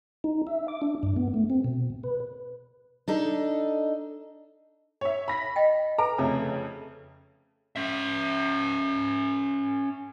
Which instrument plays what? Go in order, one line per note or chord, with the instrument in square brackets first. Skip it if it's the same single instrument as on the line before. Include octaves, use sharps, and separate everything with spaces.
[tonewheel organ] D#4
E5
D6
D4
G2
B3
A3
C4
B2
B4
[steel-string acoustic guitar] D4 D#4 A4
[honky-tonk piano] C#5 E5
B5 A#6 B6
[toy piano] D#5 G5
[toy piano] A4 B4 G#5 [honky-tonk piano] A#5
[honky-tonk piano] F2 C#3 A3
[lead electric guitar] C#4 E5